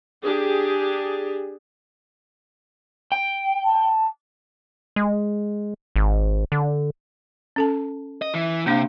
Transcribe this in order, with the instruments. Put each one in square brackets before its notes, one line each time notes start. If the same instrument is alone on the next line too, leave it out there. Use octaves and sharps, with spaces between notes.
[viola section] D4 G4 G#4
[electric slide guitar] G5
[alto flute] A5
[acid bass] G#3
G#1
D3
[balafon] C#4 A4 A5
[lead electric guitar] D#5
E3
[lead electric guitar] C3 [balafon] A#3 D4 F5